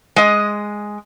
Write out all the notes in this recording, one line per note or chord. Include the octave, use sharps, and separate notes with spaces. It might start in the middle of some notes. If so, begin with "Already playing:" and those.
G#3 D#5